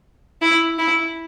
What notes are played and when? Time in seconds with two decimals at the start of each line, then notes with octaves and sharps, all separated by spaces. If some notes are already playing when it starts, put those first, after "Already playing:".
0.42 E4
0.79 E4